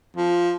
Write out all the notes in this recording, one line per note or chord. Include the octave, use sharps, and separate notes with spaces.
F3